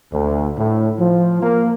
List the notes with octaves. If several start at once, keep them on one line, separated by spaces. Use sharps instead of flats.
D2
A2
F3
A#3